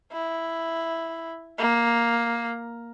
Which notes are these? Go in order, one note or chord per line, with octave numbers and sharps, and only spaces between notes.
E4
A#3